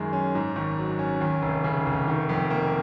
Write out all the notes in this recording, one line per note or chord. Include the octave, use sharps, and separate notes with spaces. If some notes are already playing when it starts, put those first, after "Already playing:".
Already playing: F#2 D#3 G#3
C#4
G#2
G#1
F#3
C#4
D#2
F1
C#3
F1
D#3
F2
A#3